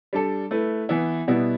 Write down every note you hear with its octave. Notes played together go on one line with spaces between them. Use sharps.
G3 D4 A4
A3 E4 B4
E3 B3 E4
B2 G3 B3 E4